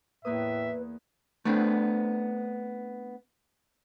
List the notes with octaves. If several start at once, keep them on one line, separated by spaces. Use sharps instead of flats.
E2 A2 A#3 B4 E5 D#6
A3 B3 C4 D4